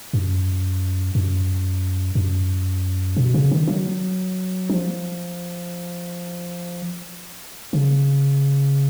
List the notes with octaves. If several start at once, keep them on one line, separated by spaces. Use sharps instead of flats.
F#2
F#2
F#2
B2
C#3
D#3
F#3
F3
C#3